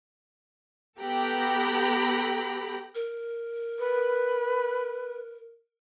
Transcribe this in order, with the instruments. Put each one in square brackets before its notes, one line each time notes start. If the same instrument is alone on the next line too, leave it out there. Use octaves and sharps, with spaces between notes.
[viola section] B3 G4 A4 G5 A#5 B5
[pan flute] A#4
[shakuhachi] B4